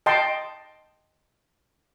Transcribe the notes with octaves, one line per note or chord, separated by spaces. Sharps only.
D#5 G5 A5 C6